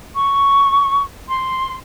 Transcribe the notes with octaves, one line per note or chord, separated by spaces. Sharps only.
C#6
C6